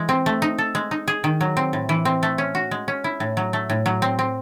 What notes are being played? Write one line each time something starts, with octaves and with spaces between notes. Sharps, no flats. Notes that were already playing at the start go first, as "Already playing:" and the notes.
Already playing: E3 G#3
C4
A3
D#4
A4
G#3
D#4
G#4
D#3
F#3
C4
A2
E3
C4
A3
C#4
F#4
G#3
C#4
E4
A2
F#3
A3
A2
F#3
C4
C4